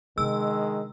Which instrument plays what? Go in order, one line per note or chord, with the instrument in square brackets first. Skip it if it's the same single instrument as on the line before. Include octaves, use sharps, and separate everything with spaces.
[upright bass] C3 D4 [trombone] D#3 [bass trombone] G#3 [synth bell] E6